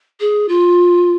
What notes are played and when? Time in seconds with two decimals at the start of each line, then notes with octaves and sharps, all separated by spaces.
0.20 G#4
0.49 F4